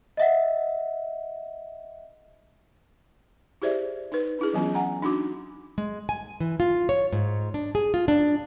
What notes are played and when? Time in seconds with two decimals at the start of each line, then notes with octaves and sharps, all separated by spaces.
0.17 D#5 E5 F#5
3.62 E4 G4 G#4 C5 D5 E5
4.12 D#4 B4
4.39 D4 E4 G#4
4.53 E3 F#3 B3 C#4 F4
4.75 F#5 G#5 A#5
5.02 D4 D#4 F#4 D6
5.78 G#3
6.09 G#5
6.40 E3
6.60 F4
6.89 C#5
7.13 G#2
7.54 D4
7.75 G#4
7.94 F4
8.08 D4